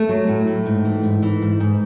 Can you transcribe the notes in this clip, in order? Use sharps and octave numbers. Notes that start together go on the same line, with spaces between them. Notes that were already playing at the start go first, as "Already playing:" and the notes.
Already playing: A3
F#3
A2
A2
G#2
E3
G#2
E3
G#2
G#2